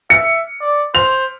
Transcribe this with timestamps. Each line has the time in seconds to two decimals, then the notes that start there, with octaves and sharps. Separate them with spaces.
0.10 E5 C#7
0.61 D5
0.95 C5 F7